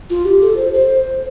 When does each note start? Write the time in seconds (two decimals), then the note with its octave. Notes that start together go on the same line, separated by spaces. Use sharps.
0.10 F4
0.25 G4
0.42 A4
0.57 C5
0.73 C5